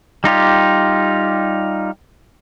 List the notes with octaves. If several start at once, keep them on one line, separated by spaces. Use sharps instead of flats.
G3 D#4 F4 G4